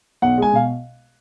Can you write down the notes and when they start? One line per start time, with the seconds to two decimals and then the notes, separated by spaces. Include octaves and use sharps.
0.22 B1 F#5
0.38 G#3 G#5
0.53 B2 F5